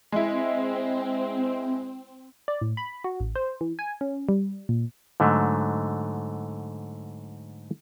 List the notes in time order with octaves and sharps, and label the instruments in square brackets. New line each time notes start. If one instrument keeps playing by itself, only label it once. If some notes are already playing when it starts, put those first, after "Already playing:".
[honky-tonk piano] G#3 E4 [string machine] C4
[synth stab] D5
A2
B5
F#4
A1
C5
E3
G#5
C#4
G3
A#2
[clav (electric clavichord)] G#2 D3 F#3 A3